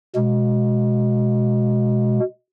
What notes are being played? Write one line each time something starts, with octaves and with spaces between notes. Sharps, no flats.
B2 G#3